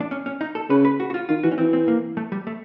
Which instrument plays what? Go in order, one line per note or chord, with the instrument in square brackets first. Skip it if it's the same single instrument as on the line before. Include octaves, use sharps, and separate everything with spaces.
[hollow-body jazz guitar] D4
C#4
C#4
D#4
A4
[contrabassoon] C#3 [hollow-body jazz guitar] B4
[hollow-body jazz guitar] B4
F#4
F#4
F4
[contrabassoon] D#3 [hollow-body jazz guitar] F4
[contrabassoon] E3 [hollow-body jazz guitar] F#4
[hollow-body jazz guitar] C#4
[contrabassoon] E3 [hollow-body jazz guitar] C4
[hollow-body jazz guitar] C4
A#3
A3
G3
A3